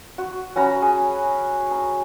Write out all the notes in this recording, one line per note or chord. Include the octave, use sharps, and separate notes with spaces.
F#4
C#4 F#4 A#5 B5
G#4
A#5